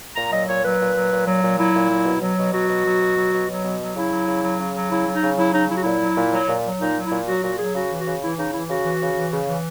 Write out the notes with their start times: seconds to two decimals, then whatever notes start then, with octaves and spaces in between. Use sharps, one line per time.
0.16 A#2 A#5
0.32 F#3 D#5
0.48 A#2 C#5
0.64 F#3 B4
0.80 A#2
0.96 F#3
1.11 A#2
1.27 F#3
1.43 A#2
1.58 F#3 E4
1.74 A#2
1.91 F#3
2.06 B2
2.22 F#3
2.38 B2
2.53 F#3 F#4
2.69 B2
2.85 F#3
3.01 B2
3.16 F#3
3.33 B2
3.49 F#3
3.64 B2
3.80 F#3
3.95 C#3 E4
4.12 F#3
4.27 C#3
4.43 F#3
4.59 C#3
4.75 F#3
4.90 C#3 E4
5.07 F#3
5.14 D#4
5.21 C#3
5.38 F#3 E4
5.53 C#3 D#4
5.69 F#3 E4
5.76 F#4
5.84 A#2 E4
6.01 F#3
6.16 A#2
6.33 F#3
6.48 A#2
6.65 F#3
6.80 A#2 D#4
6.96 F#3
7.03 E4
7.11 A#2
7.28 F#3 F#4
7.43 A#2 F#4
7.58 F#3 G#4
7.75 C#3 F#4
7.90 E3
7.98 F#4
8.06 C#3
8.22 E3 E4
8.38 C#3 D#4
8.53 E3 E4
8.69 C#3 F#4
8.85 E3
9.01 C#3
9.17 E3
9.33 C#3
9.48 E3